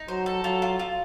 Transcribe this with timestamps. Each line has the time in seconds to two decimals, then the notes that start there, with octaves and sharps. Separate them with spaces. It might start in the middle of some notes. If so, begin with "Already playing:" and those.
Already playing: D#4
0.08 F#3 C5
0.26 A4
0.44 F#3 F4
0.62 F4
0.79 F4